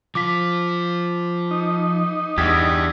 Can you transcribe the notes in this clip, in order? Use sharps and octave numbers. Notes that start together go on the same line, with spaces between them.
F3 F4 D6 B6
D#4
E2 D4 G4 E6 G#6 B6